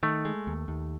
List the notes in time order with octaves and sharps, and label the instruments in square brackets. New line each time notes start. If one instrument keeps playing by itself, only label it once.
[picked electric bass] D#3 [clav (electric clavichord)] A3
[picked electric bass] G#3
D#2
D#2